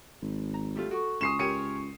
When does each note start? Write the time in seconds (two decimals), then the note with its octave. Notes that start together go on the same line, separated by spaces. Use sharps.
0.22 G#1
0.54 A#5
0.76 G3 A3 F4
0.91 F#4 A4 C#6
1.21 C#2 G#5 C6 C#6 D#6 C7 E7
1.39 G4 A#4 C#5 C#7 D#7